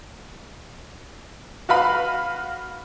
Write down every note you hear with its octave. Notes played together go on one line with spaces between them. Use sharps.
F#4 B4 F5 B5